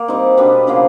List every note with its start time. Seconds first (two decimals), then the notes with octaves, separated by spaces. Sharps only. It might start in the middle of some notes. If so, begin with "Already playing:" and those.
Already playing: A#3
0.08 G3 C4 D#4
0.37 B2 G3 B3 D4
0.67 C#3 F3 A#3